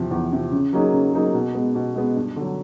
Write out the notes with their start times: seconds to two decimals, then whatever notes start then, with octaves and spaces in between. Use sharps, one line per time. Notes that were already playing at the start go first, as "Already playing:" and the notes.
Already playing: E2 C3 F3
0.11 E2
0.32 C3 F3
0.51 C#3
0.73 F#3 A#3 D#4 G#4
0.93 C#3
1.13 F#3 A#3 D#4 G#4
1.34 B2
1.55 G#3 B3
1.75 B2
1.95 G#3 B3
2.16 G2
2.36 D3 F#3